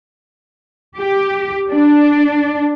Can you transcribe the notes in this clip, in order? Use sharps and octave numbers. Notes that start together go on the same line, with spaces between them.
G4
D4